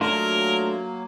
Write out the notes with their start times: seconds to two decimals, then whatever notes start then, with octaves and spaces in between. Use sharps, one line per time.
0.01 F#3 A3 A#3 D4 F4 A#4